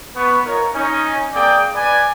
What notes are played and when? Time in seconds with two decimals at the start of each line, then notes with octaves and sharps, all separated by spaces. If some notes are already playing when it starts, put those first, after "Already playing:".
0.15 B3 B4 C#6
0.46 D#4 F4 A#4 C#5
0.74 C#4 D#4
1.34 A#3 C4 G#4 D5 G5 D#6
1.74 B4 D5 G#5